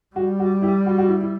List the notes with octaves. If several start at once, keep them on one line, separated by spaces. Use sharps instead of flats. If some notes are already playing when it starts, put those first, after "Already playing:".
G3 F#4
F#4
E4 G4
F#4
F#4
E4
E4